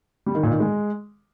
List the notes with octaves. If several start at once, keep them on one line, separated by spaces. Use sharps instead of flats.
G3
D#3
A#2
D#3
G#3